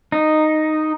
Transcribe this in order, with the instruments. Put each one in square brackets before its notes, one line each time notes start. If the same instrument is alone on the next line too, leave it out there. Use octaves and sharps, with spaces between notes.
[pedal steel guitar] D#4